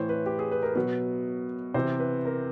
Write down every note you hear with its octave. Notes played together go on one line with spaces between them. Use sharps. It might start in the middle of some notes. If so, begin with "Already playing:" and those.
Already playing: A2 E3 C5 C#5
B4
G4
G#4
B4
A#4
B2 F#3 B4
C3 E3 C5
B4
A#4